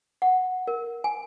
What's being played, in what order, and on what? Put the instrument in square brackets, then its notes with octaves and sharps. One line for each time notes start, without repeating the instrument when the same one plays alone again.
[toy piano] F#5
A#4
G#5